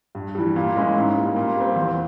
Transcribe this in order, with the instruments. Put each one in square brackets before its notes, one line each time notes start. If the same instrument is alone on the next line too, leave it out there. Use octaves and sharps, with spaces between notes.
[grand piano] G2
E3 G3
A#2
G#3 C#4 E4
G#2
G3 A#3
A#2
G3 C4
E2